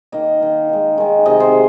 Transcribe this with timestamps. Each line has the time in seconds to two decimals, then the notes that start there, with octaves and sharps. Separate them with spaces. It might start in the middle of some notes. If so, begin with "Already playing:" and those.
0.12 D#3 A#3 D#5
0.40 D#3 A#3
0.69 D#3 G#3
0.98 D#3 G#3
1.26 C3 D#3 G#3 D#5
1.40 C5